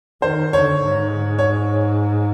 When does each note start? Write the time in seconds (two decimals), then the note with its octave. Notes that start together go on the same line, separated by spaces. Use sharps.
0.22 D#3 C5
0.53 D3 C#5
0.85 G#2
1.39 C#5